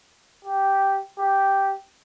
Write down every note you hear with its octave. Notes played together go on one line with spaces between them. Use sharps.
G4
G4